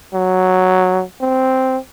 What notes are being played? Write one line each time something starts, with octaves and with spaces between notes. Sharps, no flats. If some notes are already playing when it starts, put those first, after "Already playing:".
F#3
C4